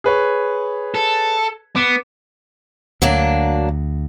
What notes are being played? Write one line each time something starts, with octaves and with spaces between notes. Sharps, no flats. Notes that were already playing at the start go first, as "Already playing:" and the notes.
G#4 B4 C#5
A4
B3 D6 D7 E7
D2 F#3 A#3 D4